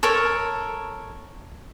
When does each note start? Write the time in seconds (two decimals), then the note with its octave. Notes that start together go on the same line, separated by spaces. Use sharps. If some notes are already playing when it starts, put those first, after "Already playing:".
0.03 A4 A#4 C#5